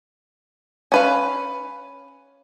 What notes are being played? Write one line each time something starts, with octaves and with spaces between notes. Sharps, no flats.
C#4 B4 F5